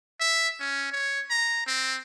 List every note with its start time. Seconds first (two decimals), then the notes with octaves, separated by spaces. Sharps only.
0.20 E5
0.60 C#4
0.92 C#5
1.30 A#5
1.67 C4